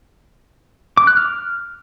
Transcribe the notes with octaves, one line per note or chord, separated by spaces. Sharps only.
D6
F#6
F6